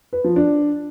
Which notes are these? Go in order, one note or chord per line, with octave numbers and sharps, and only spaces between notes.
B4
F3
D4